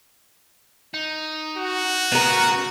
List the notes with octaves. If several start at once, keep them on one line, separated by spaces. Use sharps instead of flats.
D#4
F#4
A2 C#3 B3 A#4